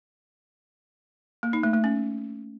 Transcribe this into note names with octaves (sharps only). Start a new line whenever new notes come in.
A#3
D#4
A3
A3
C#4